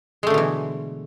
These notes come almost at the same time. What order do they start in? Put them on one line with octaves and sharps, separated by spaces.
G#3 A3 D3 B2 E3